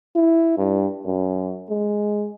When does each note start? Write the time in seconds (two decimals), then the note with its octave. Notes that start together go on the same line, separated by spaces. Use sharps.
0.16 E4
0.58 G2
1.06 F#2
1.70 G#3